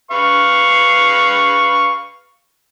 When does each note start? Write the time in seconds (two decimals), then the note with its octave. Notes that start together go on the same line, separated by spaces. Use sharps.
0.11 B4 F5 C#6